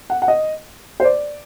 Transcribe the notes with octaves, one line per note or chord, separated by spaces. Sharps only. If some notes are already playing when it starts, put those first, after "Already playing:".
F#5
F#5
D#5
C5
D5